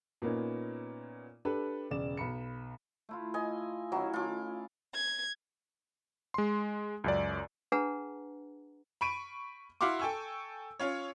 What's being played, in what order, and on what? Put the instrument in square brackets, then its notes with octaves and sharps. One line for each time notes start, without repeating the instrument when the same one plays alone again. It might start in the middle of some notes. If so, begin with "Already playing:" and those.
[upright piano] A#2 A#3 B3 C#4 D#4
D4 G4 A4 B4
E1 C#3 D5 E7
B1 B5 C#7
[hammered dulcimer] A3 E4 F4
[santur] D#5 G#5
[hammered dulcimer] D#3 C#4 E4 [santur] F#3
[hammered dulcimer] A3 A4 [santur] F4 D6
[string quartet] G#6
[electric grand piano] G#3 C6
C#2 F#2 D5
[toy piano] D4 G#4 B4 F#5 A5 A#5
[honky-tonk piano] B5 C#6 D7 D#7
E4 F#4 F5 C6 D6
A4 G5 G#5 C#6 E6
C#4 F4 C#5